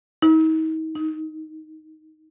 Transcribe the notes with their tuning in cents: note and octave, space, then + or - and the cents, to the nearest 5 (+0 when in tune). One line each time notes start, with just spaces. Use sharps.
D#4 +40
D#4 +5